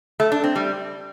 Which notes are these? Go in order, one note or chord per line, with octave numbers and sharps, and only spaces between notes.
A3
D4
C4
G3